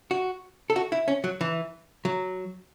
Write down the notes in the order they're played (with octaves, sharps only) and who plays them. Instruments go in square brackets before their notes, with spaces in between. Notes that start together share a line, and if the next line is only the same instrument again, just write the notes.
[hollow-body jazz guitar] F#4
A4
F#4
E4
C#4
F#3
E3
F#3